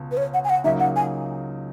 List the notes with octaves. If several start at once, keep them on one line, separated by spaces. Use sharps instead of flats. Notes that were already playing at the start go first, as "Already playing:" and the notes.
Already playing: C#2 B2
B4
C#5
F#5
G#5
F#5
C#2 C#3 F#3 A#3 D#4 E5
F#5
G#5